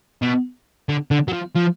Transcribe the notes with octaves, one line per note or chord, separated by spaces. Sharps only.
B2
D3
D3
F#3
F3
F3